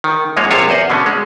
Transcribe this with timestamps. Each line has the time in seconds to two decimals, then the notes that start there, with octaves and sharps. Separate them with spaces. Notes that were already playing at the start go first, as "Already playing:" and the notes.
0.04 D#3
0.37 F#2 F3 G#3 A#3 F4 C#5
0.51 A#1 C3 F4 C#5 E5
0.69 E2 C5 D#5 F#5
0.90 B2 D3 A3 C#4
1.06 G#3